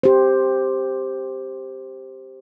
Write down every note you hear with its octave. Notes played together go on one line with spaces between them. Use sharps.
G4 C5